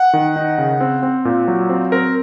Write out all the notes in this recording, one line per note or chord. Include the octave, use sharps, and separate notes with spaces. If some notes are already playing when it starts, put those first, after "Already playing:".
Already playing: F#5
D#3
D#4
C#3
C4
C4
A#2
F#3
C4
C4 A#4